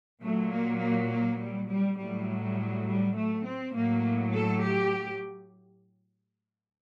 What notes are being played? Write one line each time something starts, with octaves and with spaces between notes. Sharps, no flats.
A#2 F#3 A3
A#3
A#3
A#3
G3
G3
A2 F#3 G3
G3
G3
A3
C4
A2 F#3 A#3
A4
G4